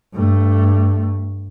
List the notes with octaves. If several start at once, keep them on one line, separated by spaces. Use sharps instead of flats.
G2 A3